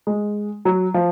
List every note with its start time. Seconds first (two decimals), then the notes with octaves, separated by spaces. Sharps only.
0.07 G#3
0.65 F#3
0.94 F3